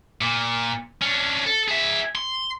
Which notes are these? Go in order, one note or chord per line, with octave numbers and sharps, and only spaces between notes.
A#2
C#4 D4
A4
G#4 E5
C6